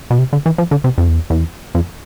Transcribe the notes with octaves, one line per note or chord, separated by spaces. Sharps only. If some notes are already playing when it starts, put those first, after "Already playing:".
B2
C3
D3
E3
F3
D3
C3
F2
E2
E2
F2